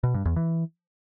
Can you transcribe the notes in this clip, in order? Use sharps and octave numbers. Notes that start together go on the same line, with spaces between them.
B2
G2
E2
E3